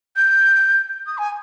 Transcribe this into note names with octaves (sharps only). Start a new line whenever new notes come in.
G6
D#6
G#5